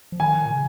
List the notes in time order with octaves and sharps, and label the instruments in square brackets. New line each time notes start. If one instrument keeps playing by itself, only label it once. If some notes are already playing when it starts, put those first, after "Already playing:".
[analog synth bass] F3
[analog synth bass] D#3 [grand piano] G#5
[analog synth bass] A#2
C#3